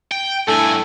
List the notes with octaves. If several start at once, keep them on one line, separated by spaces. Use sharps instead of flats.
G5
G2 A3 D4 E4 A4 G#5 A5